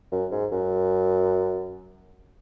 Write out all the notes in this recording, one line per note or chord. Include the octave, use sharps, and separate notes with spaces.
F#2
G#2
F#2